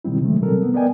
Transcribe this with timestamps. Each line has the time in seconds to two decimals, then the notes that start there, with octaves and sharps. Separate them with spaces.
0.05 B2 D#3 G3 C4 E4
0.21 C3 D#3 E3 F#3 G#3 A3
0.42 B2 F#3 G3 C4 A4 A#4
0.62 B3
0.74 B3 A#4 D5 D#5 G5 G#5